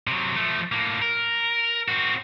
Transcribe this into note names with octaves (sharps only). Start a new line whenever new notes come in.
C3 F#3
F3 A3
A2 A#3
A#4
C4 F#4